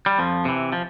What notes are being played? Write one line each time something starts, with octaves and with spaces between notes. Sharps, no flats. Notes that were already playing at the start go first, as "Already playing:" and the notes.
G3
F2 F3
C3 E3
F3